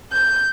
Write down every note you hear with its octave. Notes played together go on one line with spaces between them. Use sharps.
G6